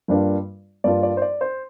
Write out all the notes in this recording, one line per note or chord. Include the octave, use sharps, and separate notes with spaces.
G2 G3 A#3 D4 F4
G2 G3 A#3 D4 F4 D5
D5
C5
D5
C5